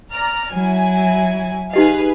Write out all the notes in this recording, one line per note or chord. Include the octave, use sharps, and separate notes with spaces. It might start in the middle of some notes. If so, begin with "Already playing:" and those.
D5 A#5 F6
F#3 E4 G#5
D#4 G4 G#4 B4 D#5 F5